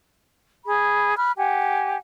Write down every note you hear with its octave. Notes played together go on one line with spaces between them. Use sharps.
G#4 B5
B5 F6 F#6
G4 F#5 G#5